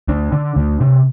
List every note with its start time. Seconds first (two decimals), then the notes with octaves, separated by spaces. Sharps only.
0.08 D2 D4
0.32 D3
0.56 D2
0.81 C3